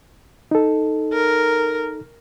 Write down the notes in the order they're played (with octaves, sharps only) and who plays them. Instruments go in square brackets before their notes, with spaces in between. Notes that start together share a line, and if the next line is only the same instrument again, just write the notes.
[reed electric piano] D#4 A4
[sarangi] A#4